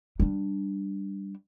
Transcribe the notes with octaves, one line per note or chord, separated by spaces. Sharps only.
G3 D4